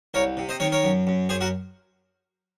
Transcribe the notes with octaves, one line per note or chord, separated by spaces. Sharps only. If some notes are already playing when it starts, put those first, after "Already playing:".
C2 A#4 C#5
C3
C5 D#5
D#3 A#4 C#5
A#4 C#5
F#2
F#2
F#2 G#4 C5
F#4 A#4